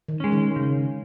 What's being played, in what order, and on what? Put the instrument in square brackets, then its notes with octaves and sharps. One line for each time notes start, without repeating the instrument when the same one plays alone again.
[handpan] D#3
[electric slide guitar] G#3 C#4
[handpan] D#3
[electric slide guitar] C#3